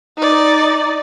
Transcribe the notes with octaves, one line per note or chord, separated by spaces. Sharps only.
D#4 D5